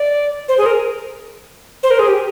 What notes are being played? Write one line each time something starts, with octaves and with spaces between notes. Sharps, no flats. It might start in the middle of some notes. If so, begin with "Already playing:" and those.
Already playing: D5
C5
G#4
A#4
C5
A#4
G#4
G4